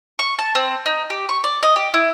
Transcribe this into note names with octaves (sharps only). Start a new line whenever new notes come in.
C#6
A5
C4
D#4
G4
C#6
D5
D#5
G4
E4